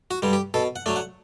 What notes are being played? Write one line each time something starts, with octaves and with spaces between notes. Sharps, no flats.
F#4
G2 D3 G3
G4
B2 A4
F#5
F#3 A3 D4
F#5